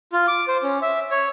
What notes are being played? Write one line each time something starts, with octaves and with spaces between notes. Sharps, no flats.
F4
D6
C5
C#4
E5
C#5